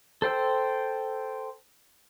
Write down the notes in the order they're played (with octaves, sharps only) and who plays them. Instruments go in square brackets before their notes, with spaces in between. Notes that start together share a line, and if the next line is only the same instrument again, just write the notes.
[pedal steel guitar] A4 C5 G5 E6